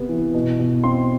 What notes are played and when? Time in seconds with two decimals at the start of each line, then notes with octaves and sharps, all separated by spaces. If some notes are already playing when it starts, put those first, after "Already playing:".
Already playing: C3 B3
0.09 E3
0.34 B2
0.59 B2
0.84 C4 C6